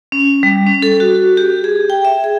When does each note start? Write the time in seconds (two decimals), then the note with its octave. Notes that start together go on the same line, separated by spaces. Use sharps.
0.12 C#4
0.43 G3
0.67 C#4
0.82 A4
1.00 F#4
1.37 G4
1.64 G#4
1.90 G5
2.05 E5
2.24 G#4